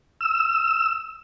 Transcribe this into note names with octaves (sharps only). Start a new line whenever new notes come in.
E6